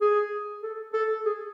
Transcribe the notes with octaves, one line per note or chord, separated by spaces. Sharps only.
G#4
A4
A4
G#4